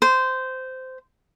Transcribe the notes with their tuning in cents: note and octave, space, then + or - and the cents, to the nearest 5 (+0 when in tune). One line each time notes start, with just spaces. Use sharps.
C5 -15